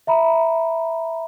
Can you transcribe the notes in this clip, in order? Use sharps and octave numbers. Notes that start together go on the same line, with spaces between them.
E5 A#5 B5